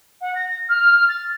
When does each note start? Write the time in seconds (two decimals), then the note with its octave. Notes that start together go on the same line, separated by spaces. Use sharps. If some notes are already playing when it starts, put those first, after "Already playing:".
0.21 F#5
0.35 A#6
0.69 F6
1.09 A6